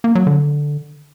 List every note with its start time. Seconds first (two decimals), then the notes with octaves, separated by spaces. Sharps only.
0.04 A#3
0.15 F#3
0.27 D3